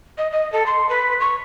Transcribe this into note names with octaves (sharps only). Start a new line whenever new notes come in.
D#5
D#5
A4
C6
B4
C#6